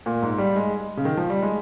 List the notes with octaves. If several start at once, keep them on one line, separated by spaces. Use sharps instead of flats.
A#2
G#2
G3
G#3
C#3
D#3
F3
G3
G#3